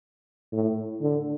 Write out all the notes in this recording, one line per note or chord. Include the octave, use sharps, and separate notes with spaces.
A2
D3